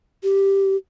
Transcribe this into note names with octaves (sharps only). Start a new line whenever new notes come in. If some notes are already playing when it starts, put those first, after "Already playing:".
G4